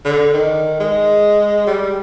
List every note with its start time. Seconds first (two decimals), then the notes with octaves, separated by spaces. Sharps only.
0.05 D3
0.34 D#3
0.80 G#3
1.67 G3